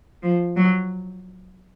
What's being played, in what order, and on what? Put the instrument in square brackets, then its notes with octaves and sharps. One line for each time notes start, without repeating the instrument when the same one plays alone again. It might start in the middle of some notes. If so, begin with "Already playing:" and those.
[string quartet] F3
F#3